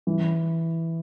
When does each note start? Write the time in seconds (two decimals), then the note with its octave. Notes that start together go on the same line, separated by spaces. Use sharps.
0.07 E3